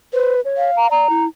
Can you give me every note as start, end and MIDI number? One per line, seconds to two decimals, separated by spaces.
0.13 0.40 71
0.13 0.35 72
0.45 0.71 73
0.57 0.91 77
0.77 0.87 82
0.91 1.08 74
0.91 1.25 82
1.10 1.27 64